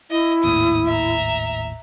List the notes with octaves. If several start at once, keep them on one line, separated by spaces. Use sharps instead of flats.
E4 D#5
G#1 D#2 A2 D#6
E5 A#5